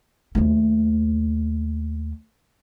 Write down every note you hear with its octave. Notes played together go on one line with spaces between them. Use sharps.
D#2 A3